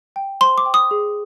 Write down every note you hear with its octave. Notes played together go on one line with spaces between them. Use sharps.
G5
C5 C6
D6
G5
D#6
G#4